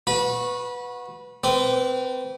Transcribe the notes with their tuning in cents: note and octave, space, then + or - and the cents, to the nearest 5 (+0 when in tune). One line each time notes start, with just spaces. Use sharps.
F#4 -25 B4 +0 B5 -30
C4 -25 B4 -10 D6 -35